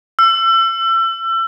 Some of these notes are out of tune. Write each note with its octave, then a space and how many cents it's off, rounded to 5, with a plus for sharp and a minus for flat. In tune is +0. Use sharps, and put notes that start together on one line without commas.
E6 +30